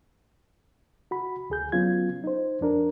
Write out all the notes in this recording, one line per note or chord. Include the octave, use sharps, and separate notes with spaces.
F#4 B5
D2 G#4 G6
F#3 B3 C#4 F4 G#6
D#4 C5
F2 D4 A#4